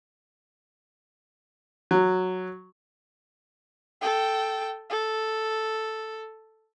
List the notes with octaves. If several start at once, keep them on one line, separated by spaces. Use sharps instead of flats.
F#3
A4 G5
A4